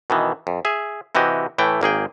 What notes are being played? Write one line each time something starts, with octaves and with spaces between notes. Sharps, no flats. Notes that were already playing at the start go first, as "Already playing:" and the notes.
B2 D#3 E3
F2
G#4 E5
C3 E3 F#4 G4 D#5
A2 E3 A3 G5
G#1 A#3 G#4 G5